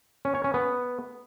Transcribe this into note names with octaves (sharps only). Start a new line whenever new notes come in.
C#4
C#5
C#4
B3